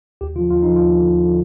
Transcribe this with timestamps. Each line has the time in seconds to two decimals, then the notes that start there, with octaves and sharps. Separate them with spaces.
0.21 D#2 G4
0.36 D3 F4
0.39 F3
0.50 D#2 F4
0.63 D3 F3 D#4
0.76 D#2 F4
0.94 D3 F3
1.09 D#2
1.24 D3 F3